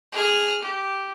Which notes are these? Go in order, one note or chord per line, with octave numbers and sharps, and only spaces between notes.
G#4 F6
G4